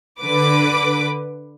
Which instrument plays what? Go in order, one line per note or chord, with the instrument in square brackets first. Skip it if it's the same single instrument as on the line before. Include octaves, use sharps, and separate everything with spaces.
[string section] D3 B4 D6